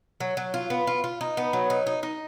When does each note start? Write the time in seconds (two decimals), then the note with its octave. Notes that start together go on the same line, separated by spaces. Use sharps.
0.20 F#3
0.37 F#3
0.54 F4
0.70 B3
0.87 F4
1.04 F4
1.21 D#4
1.37 B3
1.53 F#3
1.70 D#4
1.87 D#4
2.03 D#4